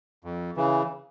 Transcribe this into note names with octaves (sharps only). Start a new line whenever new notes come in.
F2
C#3 E3